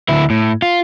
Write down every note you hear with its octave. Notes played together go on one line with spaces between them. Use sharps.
D2 E4
A2
F4